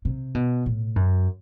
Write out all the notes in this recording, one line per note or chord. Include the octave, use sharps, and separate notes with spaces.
C3
B2
A2
F#2